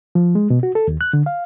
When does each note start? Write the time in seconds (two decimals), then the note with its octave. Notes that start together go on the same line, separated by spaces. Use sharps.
0.15 F3
0.35 G#3
0.50 B2
0.63 F#4
0.75 A4
0.88 D#2
1.01 F#6
1.13 D3
1.26 F5